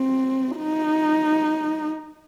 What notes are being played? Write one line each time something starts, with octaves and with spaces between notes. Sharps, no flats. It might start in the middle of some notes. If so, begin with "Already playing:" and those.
Already playing: C4
D#4